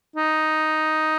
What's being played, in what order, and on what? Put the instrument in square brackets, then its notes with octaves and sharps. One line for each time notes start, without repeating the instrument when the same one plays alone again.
[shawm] D#4